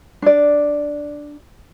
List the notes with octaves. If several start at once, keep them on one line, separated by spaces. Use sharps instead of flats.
D4 D5